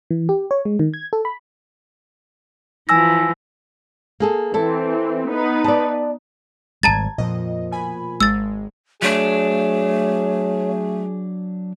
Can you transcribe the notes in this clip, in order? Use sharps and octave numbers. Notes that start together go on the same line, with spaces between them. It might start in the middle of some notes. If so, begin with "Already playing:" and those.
E3
G4
C#5
G#3
D#3
G#6
A4
B5
E3 F3 G#5 E6 A#6
A#3 G#4 A4
E3 C4 E4 A4
B3 D#4 B4
D5 A5
G#1 G3 A5 A#5 G#6 A6
F2 A#2 F3 D#5
B2 G#5 B5
G#1 G#3 E6 A6
F#3 A3 D4 G#4 C#5